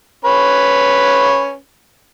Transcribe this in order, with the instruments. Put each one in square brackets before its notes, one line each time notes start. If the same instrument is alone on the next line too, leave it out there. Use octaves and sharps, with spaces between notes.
[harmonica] C#4 B4